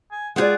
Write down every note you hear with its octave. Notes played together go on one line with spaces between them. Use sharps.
G#5
G#3 B3 F4 G#4 D5 F#5